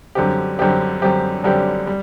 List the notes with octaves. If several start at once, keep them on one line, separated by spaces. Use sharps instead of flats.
F#2 D3 G3 C4 G4
F#2 D3 G3 C4 G4
F#2 D3 G3 C4 G4
F#2 D3 G3 C4 G4
G3